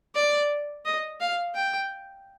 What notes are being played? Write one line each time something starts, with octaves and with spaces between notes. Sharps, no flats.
D5
D#5
F5
G5